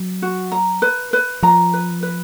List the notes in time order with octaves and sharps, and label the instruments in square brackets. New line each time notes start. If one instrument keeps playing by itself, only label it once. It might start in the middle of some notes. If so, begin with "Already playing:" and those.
Already playing: [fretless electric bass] F#3
[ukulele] F#4
A#5
B4
B4
[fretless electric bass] F3 [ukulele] A#5
[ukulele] B4
B4